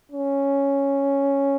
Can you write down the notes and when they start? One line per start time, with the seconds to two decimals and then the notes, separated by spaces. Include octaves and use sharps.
0.12 C#4